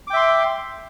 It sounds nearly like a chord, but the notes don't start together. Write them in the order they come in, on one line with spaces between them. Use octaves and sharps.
D6 G5 E5 C6